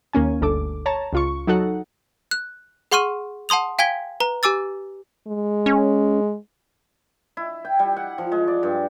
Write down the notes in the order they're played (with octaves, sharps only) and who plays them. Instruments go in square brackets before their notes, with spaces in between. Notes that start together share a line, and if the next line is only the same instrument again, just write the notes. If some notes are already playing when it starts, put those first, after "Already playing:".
[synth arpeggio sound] D#2 A#3 C#4 G#5
G1 D2 A4 D6
C#5 A5 A#5
C#2 F4 C#6
F#3 D#4 F#4 A4 F#5
[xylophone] F#6
G#4 F#5 C6 C#6 F6 D#7
F#5 A5 C6 D#6 F7
F5 G5 G#5 G#6 B6 G7
B4 A#5
G4 G#5 D6 E6 A6
[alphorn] G#3
[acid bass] C#4
[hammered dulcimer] E4
G5
G3
F#5
F3
G#3
D5
G2